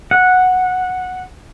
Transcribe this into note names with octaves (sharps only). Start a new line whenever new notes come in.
F#5